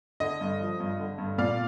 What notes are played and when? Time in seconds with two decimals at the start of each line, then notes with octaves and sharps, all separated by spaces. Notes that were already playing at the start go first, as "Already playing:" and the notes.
0.20 D3 D#5
0.41 G2
0.61 F3
0.80 G2
0.99 D3
1.18 G2
1.38 A#2 D5 F5